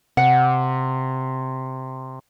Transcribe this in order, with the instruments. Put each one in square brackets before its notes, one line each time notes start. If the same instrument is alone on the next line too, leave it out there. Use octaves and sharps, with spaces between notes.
[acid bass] C3 [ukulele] F#5